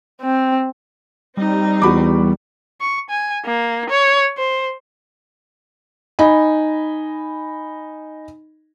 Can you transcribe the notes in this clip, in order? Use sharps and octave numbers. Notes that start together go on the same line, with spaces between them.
C4
G3 C4 D#4
E2 F#4 B5 D6
C#6
G#5
A#3
C#5
C5
D#4 D#5 G#5 B5